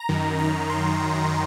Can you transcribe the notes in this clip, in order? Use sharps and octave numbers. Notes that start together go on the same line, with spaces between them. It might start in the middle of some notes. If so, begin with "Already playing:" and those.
Already playing: A#5
F#2 D#3
A#5
C6